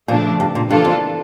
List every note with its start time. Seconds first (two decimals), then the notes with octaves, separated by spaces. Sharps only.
0.08 A#2 C#3 F3 A3 D4
0.40 G2
0.55 A#2
0.70 G2 E3 A#3 D4 F4 A4
0.85 F2